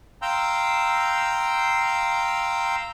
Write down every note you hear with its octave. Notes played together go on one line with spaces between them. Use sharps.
F5 G5 A#5 C6 E6 G6